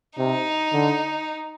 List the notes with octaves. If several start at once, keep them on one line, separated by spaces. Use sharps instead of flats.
C3 D#4
D3